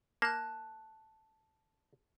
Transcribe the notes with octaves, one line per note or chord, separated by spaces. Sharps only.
A#3 A5 F#6